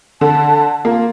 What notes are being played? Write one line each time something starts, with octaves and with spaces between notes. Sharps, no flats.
D3 A5
A#3 F4